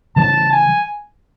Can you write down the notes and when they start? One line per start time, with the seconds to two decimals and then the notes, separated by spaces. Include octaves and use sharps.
0.16 C#3 E3 G3 A5
0.52 G#5